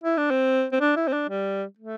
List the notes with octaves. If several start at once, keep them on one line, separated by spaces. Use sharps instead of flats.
E4
D4
C4
C4
D4
E4
C4
D4
G3
A3